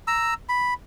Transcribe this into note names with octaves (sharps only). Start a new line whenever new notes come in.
A#5 E6
B5